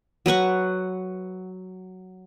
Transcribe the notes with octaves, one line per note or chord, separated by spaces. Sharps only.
F#3 B4 F#5 C#6